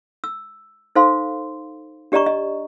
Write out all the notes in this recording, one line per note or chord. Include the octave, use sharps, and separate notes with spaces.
E6
D#4 A4 C5 F5 C6
D4 G4 D5 D#5 A#5 C#6
D#5